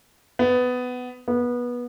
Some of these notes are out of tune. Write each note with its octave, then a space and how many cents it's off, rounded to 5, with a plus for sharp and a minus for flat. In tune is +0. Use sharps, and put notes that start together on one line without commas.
B3 +15
B3 -20